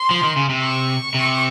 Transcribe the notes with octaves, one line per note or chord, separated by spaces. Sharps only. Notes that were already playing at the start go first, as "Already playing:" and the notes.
Already playing: C6
F3
D#3
C#3
C3
C#6
C3